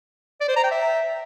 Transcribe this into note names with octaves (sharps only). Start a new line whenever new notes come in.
D5
C5
A#5
G5
E5